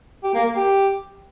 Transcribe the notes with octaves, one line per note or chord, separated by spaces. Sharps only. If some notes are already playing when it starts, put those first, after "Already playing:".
G4
A#3
A#3
G4